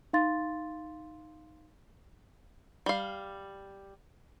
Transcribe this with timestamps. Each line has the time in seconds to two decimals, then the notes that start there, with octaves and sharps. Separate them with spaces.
0.13 D#4 F5 C6 A6
2.86 G3 F5